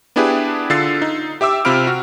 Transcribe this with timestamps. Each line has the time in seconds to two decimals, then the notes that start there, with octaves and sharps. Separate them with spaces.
0.16 B3 D4 E4 G4 G#4 B4
0.70 D3 F4 E6 A6 C7
1.02 D#4
1.41 G4 E5 D6 E6
1.65 C3 C4 F4 B5 F6 D7
1.87 F#4